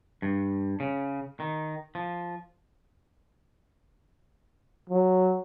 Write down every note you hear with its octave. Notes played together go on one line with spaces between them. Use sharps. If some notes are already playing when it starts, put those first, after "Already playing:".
G2
C#3
D#3
F3
F#3